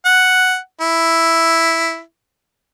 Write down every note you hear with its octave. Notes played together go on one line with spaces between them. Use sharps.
F#5
E4